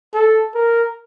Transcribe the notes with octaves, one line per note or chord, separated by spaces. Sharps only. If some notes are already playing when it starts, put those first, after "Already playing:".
A4
A#4